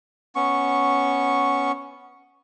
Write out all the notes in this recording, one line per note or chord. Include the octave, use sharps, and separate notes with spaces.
B3 C#4 C#6